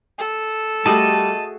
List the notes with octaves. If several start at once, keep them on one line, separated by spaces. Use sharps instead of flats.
A4
G3 A3 F#4 G#4 D#5 A5